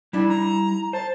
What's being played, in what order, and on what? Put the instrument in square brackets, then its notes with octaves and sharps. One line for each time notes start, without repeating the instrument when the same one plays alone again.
[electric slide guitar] G3 E4 [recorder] D4
[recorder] A#5
[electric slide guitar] C5 [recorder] A5